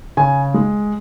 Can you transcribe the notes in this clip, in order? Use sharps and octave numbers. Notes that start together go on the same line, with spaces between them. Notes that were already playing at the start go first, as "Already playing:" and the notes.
C#3 G#5
G#3